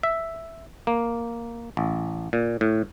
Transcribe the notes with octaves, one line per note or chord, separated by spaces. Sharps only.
E5
A#3
A1
A#2
A2